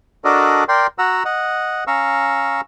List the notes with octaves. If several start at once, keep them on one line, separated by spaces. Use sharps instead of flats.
D4 F#4 A4 A#4 D5 D#5
A#4 D5 G5 C6
F#4 F#5 A#5 E6
D#5 F#5
C#4 F5 A#5 C#6 E6